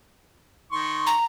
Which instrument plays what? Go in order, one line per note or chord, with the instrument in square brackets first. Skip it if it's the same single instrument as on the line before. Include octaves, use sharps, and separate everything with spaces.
[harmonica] D#3 C6 C#6
[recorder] A#5